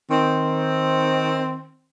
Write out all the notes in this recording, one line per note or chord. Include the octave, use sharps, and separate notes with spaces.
D#3 C4